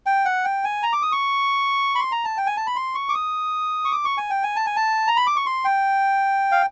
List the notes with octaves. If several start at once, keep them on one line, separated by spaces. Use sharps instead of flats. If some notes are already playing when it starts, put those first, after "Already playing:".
G5
F#5
G5
G#5
A#5
D6
D#6
C#6
B5
C6
A#5
A5
G5
G#5
A5
B5
C6
C#6
D6
D#6
C#6
D6
C#6
G#5
G5
G#5
A5
G#5
A5
A#5
B5
D6
C#6
C6
G5
F5